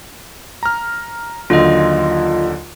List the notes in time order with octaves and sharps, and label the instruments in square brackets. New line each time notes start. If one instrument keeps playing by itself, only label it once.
[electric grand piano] A#5 F6
[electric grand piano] D#2 D3 F#3 [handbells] F4 D#5